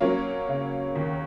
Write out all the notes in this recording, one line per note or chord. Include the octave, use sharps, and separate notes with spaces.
F#3 A#3 C#4
C#3
D#2